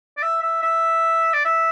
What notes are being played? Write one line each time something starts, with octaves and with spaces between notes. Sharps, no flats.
D5
E5
E5
E5
D5
E5